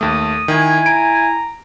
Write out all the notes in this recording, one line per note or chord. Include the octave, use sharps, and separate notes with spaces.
D#2 A3 D#6
D#3 E4 G#5
A#5 D7